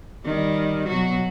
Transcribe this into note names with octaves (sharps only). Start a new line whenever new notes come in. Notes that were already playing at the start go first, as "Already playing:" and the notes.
D#3 G3
B2 F#3 F#4